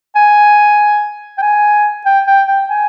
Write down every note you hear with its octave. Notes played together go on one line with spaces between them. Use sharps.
G#5
G5
G#5
G5
G5
G5
G#5